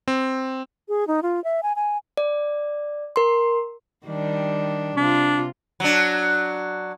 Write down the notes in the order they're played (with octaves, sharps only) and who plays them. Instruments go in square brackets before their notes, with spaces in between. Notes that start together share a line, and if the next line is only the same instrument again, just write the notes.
[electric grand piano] C4
[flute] G#4
D#4
F4
E5
G#5
G#5
[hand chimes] D5
A#4 C6
[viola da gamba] D#3 G3 D4
[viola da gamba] C3 F4 [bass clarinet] D4
[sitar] F#3 D4